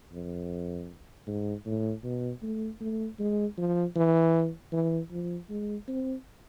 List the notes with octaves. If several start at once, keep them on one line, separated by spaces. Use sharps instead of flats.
F2
G#2
A2
B2
A3
A3
G#3
F3
E3
E3
F3
G#3
C4